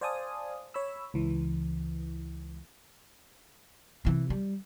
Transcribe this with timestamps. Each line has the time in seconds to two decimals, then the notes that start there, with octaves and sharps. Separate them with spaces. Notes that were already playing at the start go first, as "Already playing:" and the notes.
0.01 C5 D5 F5 G#5 A5 D#6
0.74 C#5 B5 E6
1.14 C#2 E3
4.05 C3 E3
4.30 G3